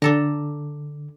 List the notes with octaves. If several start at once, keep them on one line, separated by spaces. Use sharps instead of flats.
D3 D4 A4 A#5